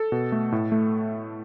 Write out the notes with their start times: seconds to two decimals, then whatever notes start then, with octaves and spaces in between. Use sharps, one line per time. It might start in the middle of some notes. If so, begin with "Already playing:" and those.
Already playing: A4
0.12 B2
0.32 A3
0.52 A2
0.72 A3